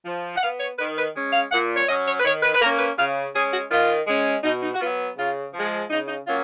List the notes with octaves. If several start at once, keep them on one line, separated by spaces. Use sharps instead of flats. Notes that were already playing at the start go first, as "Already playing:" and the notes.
F3
F#5
B3 F5
C#5
D#3 B4
B4
G#3 C#4
F5
A#2 F#5
C#5
F#3 C#4 D#5
C#5
B4
D#3 C#5
B4
B4
A#3 A#4
C#4
B4
C#3 F5
G#3 C#4 G#4
F#4
D#3 F4
G#3 C#4
B2 D#4
D#4
F#4
F#3 B3 F4
C#3 F4
F3
G#3
C#3 D#4
D#4
F#3 A#3 C#4 F4